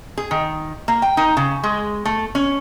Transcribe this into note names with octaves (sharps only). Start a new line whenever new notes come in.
G#4
D#3
A#3
G5
D#4
C#3
G#3
A3
C#4